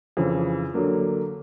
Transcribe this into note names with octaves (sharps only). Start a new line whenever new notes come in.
F2 C#3 E3
D3 F#3 A#3